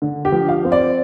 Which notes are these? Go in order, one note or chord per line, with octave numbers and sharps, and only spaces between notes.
D3
G4
F3
F5
C4
D5